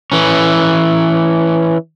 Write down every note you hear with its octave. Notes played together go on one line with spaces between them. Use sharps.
E3 C#4